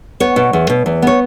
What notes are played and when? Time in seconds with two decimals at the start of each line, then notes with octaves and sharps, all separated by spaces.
0.20 B3 C#5
0.36 B2
0.53 E2
0.70 B2
0.86 E2
1.02 B3 C#5